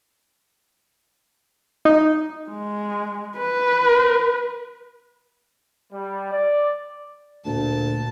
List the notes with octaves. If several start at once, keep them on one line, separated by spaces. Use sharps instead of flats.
D#4
G#3
B4
G3
D5
D2 A#2 A5